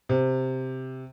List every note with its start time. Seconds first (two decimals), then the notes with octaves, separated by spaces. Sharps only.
0.09 C3